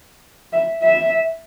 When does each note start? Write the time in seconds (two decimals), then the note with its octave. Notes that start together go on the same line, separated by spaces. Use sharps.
0.53 E5
0.82 E5